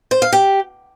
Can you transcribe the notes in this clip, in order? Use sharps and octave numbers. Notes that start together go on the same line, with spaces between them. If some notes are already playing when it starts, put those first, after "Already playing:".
C5
F5
G4